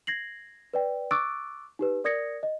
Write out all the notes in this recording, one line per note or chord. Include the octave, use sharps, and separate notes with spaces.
G#6 A#6 C7 F#7
B4 D5 G5
C#6 D6 E6 F#6 A6 D7
D#4 G4 B4
A#4 D5 D#6 G#6 A#6 C#7
D#5